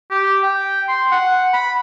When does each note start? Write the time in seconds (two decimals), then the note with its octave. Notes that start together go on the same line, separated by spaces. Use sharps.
0.11 G4
0.43 G5
0.89 C6
1.12 F#5
1.53 B5